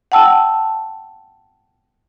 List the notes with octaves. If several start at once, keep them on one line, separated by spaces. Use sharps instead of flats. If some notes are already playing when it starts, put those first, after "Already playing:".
F#5 G5 A5 E6